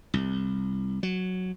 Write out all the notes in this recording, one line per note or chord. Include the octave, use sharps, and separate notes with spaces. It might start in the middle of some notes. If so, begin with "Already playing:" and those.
C2
F#3